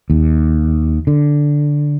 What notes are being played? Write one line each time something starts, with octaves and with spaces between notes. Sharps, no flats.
D#2
D3